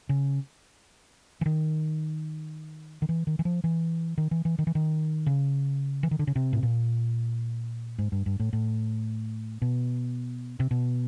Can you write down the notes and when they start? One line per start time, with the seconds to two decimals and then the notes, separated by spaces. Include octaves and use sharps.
0.09 C#3
1.41 E3
1.46 D#3
3.02 D#3
3.09 E3
3.27 D#3
3.39 E3
3.45 F3
3.64 E3
4.18 D#3
4.31 E3
4.45 E3
4.59 D#3
4.67 E3
4.75 D#3
5.26 C#3
6.03 E3
6.11 D#3
6.19 D3
6.27 C#3
6.36 C3
6.53 A2
6.63 A#2
7.99 G#2
8.12 G2
8.26 G2
8.40 A2
8.53 A2
9.62 B2
10.60 C3
10.71 B2